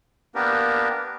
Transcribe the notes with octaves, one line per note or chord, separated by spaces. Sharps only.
A#3 B3 D4 G4 A#4 B4